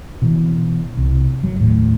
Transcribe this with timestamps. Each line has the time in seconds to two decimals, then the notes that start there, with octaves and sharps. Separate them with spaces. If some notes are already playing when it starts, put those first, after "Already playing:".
0.22 B2 E3
0.97 C2
1.43 G1 F#3
1.60 D#2 A2